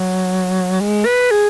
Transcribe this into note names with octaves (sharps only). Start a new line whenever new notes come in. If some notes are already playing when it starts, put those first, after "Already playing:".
Already playing: F#3
G#3
B4
G#4